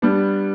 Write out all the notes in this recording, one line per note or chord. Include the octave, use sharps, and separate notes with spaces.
G3 B3 D4